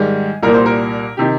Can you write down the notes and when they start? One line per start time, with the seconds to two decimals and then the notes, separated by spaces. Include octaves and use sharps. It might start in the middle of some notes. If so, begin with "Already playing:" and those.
Already playing: G#2 D#3 G3 G#4
0.43 C2 A#2 G3 A#3 A#4
0.54 C5
0.66 A#4
1.17 C3 D#3 G4